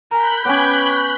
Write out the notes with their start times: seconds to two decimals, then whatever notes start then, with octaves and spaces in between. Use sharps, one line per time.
0.11 A#4 G#5 A#5 B5 F#6 G6
0.45 B3 C#4 C#5 G5 G#5 D6 G#6